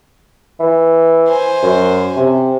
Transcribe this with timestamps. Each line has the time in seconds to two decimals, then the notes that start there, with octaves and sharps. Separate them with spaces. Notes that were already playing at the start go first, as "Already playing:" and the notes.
0.60 E3
1.28 C5 G#5
1.63 F#2
2.17 C3